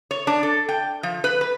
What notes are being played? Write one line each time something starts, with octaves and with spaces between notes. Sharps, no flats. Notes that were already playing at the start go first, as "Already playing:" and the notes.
C#5
D4
A4
G5
F3
B4
B4